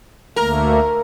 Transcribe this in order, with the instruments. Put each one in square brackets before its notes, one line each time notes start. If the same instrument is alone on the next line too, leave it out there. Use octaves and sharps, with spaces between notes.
[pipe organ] D2 A3 A#3 [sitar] A#4